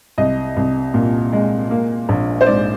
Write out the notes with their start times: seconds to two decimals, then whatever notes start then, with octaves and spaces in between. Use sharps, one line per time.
0.18 C2 D#5
0.57 C2
0.94 A#2
1.33 G#3
1.71 A#3
2.09 A#1
2.41 C5
2.46 G#2 D5